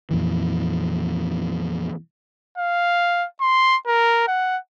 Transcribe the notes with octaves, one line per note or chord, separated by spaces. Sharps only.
F2 A#2 E3
F5
C6
A#4
F#5